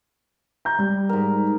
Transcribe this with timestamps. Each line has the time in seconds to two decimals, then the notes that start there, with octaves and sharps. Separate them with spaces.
0.65 A#5 G6
0.79 G3
1.09 G#2 A#4